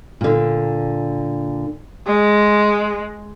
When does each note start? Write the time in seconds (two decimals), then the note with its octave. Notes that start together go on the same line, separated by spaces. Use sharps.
0.21 A#2 D3
2.07 G#3